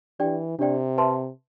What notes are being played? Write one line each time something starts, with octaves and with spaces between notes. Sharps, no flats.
E3 D4 G4 D5 G5
C3 D4 G4 D5 G5
B4 E5 A5 C6